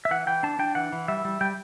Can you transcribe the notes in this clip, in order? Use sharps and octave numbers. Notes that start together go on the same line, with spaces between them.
E5
E3 F#5
E3 G5
D4 A5
D4 G5
E3 F#5
E3
G3 E5
G3
G3 G5